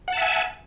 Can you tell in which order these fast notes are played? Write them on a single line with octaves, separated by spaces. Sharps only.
F#5 A5 E5 G#5